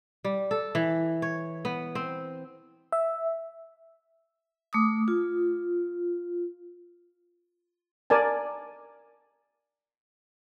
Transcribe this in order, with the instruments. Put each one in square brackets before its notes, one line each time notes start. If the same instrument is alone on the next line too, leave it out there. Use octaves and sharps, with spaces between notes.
[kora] G3
A4
E3
C#5
B3
C4
[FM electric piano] E5
[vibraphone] A3 D6 D#6
F4
[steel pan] A#4 D5 G#5 A5